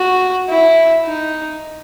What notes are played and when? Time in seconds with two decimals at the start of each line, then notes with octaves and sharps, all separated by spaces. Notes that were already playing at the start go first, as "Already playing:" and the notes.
Already playing: F#4
0.49 E4
1.05 D#4